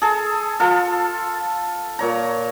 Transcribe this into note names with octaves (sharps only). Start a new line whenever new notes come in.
G#4 A4
F4 A4
A#2 C#5 A#5